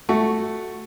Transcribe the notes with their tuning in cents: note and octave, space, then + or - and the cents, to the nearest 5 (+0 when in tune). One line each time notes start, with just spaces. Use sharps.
A3 +0 F#4 +0